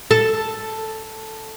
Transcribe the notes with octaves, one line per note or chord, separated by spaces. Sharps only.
A4